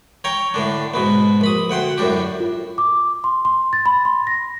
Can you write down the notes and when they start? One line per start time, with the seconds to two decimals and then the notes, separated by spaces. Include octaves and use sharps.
0.24 C#5 G5 A#5 C#6
0.54 A2 D3 D4
0.94 G#2 B2 B3
1.41 A#1 B5 D#6
1.70 D2 F#5 G5 C6
1.98 F#2 A2 D4 G4
2.40 F4
2.78 D6
3.24 C6
3.45 C6
3.73 A6
3.86 B5
4.05 C6
4.27 A#6